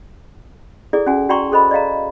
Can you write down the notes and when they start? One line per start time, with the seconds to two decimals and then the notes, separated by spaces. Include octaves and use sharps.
0.93 E4 G#4 A4 D5
1.06 C#4 F#4 G#5
1.29 F#4 D5 G5 A#5 C6 C#6
1.51 G#4 A4 C5 D#5 B5
1.71 D5 D#5 F5 A#5